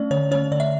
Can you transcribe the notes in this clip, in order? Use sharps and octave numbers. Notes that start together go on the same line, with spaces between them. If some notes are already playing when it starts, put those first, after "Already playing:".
Already playing: A3 C#4 D5
D3 C#5
A3 C#4 C#5
D3 D5
E5